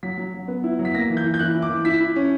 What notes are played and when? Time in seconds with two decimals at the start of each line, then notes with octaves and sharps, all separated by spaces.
0.03 F#3 B6
0.18 F#3
0.34 F#3
0.48 B3
0.64 E4
0.79 F#3
0.85 B6
0.95 A#3 A#6
1.10 E3
1.17 G6
1.24 E3
1.34 G6
1.39 E3 F#6
1.55 E4
1.62 D6
1.70 E3
1.85 E4 B6
2.00 E4
2.16 C#4